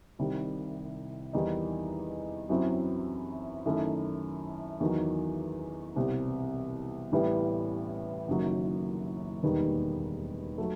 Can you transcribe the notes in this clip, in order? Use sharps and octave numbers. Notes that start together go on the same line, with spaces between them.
C2 C3 D#3 G3 C4
E2 D#3 G3 D#4
F#2 F#3 C4 E4
F#2 D#3 A3 E4
E2 D#3 F#3
C2 B2 G3 C4
A1 A2 E3 G3 B3
F#1 F#2 D#3 F#3
E1 D#2 D#3 G3 B3
F#3 A3